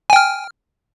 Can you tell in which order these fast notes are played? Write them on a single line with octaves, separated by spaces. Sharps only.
G#5 G5 F6